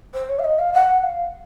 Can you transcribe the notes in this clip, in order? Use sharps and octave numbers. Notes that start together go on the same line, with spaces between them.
C5
C#5
F5
D#5
F5
F#5
F5